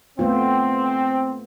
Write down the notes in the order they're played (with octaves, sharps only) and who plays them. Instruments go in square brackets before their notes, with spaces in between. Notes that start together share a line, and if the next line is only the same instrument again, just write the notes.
[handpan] A3 B3 F4 [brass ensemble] C4